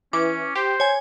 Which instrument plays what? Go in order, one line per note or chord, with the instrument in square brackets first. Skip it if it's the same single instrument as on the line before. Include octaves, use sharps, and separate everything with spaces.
[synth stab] E3 [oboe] C#4 [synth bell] D6
[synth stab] G4 [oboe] C5
[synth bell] C#5 G#5 [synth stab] G#6